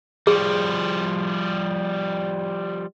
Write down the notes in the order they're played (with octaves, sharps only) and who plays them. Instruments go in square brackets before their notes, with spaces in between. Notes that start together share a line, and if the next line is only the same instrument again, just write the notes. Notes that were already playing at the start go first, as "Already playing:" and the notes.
[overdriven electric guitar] F3 G3 [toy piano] G#4